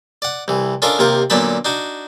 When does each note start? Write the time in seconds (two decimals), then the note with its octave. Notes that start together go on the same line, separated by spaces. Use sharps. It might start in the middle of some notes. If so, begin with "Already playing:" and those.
0.22 D5 F#5
0.48 C2 E3
0.82 C#4 D4 F4 A4 A#4 D#5
0.99 D#2 C3 F4 A#4
1.30 A#2 D3 F#3 B3 A5 B5
1.65 D4 D#4 F#4